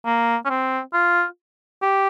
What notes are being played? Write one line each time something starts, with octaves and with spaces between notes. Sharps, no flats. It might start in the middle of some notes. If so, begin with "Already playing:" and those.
A#3
C#4
C4
F4
G4